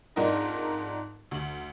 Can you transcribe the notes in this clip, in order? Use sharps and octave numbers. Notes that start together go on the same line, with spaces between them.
F2 G#2 D4 D#4 A#4 D#5
D2 F#7